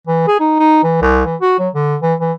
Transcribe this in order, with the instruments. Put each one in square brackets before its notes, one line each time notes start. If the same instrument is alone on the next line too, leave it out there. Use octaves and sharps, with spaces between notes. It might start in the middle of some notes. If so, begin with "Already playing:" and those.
[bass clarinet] E3
G#4
D#4
D#4
E3
C2
E3
F#4
F#3
D3
E3
E3